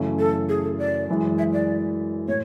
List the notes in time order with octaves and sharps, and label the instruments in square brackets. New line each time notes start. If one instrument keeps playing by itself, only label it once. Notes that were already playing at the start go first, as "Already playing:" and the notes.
Already playing: [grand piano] F#2 C#3 E3 A3 C#4
[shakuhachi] A4
G#4
A4
D5
[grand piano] F#2 E3 G#3
[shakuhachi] E5
D5
[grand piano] A2 [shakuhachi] C#5